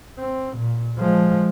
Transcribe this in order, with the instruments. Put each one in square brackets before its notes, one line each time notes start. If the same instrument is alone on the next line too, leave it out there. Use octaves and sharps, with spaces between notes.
[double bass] C4
A#2
F3 G#3